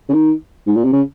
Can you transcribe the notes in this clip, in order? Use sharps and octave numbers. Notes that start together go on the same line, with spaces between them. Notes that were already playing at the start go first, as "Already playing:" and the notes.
C#3
D#3
G#2
A#2
C3
C#3